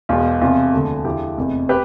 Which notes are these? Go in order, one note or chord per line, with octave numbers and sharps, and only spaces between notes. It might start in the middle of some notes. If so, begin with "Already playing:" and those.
E1 E2 B2 F4
E2 C3 F3 F4
E1 D2 D3 F3
E2 D3 F3 E4 G4
F1 E2 C3
G4 B4